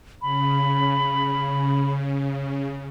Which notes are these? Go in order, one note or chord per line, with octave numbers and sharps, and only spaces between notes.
C#3 B5